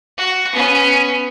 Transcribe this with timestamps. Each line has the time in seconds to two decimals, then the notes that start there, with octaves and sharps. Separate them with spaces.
0.18 F#4
0.53 B3 C#4